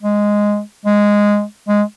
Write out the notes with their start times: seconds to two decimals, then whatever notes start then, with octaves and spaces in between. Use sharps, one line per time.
0.02 G#3
0.85 G#3
1.68 G#3